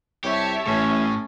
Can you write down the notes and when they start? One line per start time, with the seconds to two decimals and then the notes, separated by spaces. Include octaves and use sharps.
0.24 C2 G4 C#5 E5 A5
0.67 A1 A2 C#4